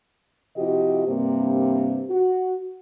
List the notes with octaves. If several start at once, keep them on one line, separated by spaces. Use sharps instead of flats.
C3 F3 E4 F#4 G4 D#5
G2 C3 A#3
F#4